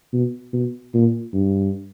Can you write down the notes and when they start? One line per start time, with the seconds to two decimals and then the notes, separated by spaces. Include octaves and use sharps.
0.13 B2
0.53 B2
0.94 A#2
1.33 G2